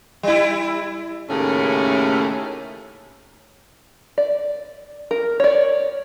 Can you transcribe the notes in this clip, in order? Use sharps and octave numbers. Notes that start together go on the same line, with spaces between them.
G3 E4
D#2 A2 C#3 A3 C#4
D5
A#4
C#5 D5